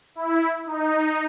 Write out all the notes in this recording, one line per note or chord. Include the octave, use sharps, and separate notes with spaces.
E4
D#4